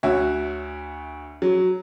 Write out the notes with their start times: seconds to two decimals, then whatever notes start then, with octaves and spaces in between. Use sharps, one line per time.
0.03 D2 F#4 C#5 E5
1.42 F#3